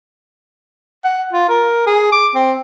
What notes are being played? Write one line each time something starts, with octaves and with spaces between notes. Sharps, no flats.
F#5
F4
A#4
G#4
D6
C4